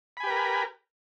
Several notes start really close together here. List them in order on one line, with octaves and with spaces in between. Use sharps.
B5 G#5 G4 B4 A#4